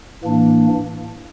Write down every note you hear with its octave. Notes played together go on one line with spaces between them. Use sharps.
A2 E3 A#3 D4